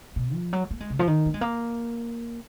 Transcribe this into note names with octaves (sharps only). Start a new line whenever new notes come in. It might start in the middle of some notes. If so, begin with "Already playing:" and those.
B2
F3
F#3
A#3
G#3
C#3
F3
D#3
A#3
G#3
A#3